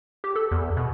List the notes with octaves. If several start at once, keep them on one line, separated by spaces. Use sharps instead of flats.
G4
A4
E2
B2